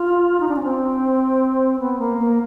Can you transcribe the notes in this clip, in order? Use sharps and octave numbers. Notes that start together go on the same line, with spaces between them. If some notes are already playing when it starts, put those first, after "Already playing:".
Already playing: F4
D#4
D4
C#4
C4
B3
A#3
A#3